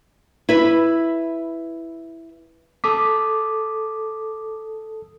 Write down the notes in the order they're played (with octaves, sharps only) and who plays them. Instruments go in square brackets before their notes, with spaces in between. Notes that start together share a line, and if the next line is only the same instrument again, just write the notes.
[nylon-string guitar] E4 B4
[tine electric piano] A4 D#6 B6 [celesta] D6